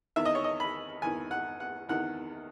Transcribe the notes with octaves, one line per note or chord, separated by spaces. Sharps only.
E2 D#3 E5
D#5
C#5
D#5
B5
E2 D#3 G#5
F#5
F#5
E2 D#3 F#5